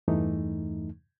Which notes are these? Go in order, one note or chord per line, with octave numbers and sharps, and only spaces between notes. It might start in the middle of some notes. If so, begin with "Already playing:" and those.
E2 G2 E3 A3 D#4